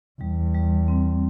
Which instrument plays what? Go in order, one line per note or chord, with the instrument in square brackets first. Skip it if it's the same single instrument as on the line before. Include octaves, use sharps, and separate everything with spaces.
[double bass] E2 [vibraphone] G3
[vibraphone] G3
C4